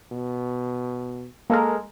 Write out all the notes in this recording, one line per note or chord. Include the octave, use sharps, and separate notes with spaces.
B2
G#3 A#3 A4 A#4